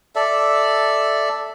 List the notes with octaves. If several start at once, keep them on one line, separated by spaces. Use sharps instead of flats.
A4 D5 E5